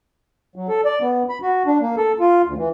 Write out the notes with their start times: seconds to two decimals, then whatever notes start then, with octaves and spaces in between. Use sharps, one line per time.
0.56 F#3
0.69 A4
0.85 D5
1.02 B3
1.29 B5
1.42 F#4
1.66 D4
1.81 A#3
1.97 A4
2.20 F4
2.46 D2
2.58 E3